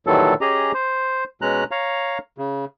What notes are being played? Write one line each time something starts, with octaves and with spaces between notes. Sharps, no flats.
A#2 D#3 E3 F#3 G3 A4
C#4 G4 G#4 D#5 A#5
C5
B2 G#3 C#4 A#5 F#6
C#5 F5 A#5
C#3